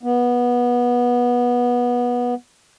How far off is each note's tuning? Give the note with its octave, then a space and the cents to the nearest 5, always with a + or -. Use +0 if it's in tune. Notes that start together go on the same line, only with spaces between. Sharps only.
B3 -20